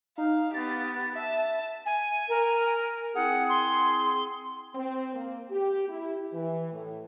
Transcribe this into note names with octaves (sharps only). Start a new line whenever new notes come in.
D#4 F5
B3 G4 A6
E5 A5
G#5
A#4
C4 E4 G#4 F#5
C6
C4
A#3
G4
E4
E3
A2